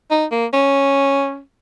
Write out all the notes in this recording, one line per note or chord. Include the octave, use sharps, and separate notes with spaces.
D#4
A#3
C#4